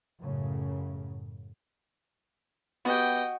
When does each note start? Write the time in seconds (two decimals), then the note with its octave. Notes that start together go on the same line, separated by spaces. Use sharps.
0.19 F#2 A2 C#3
2.85 B3 F#4 G4 D#5 G5